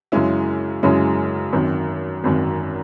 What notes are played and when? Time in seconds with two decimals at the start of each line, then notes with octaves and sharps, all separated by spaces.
0.12 F#2 C#3 G#3 C#4 E4
0.83 F#2 C#3 G#3 C#4 E4
1.53 G#1 F#2 D#3
2.24 G#1 F#2 D#3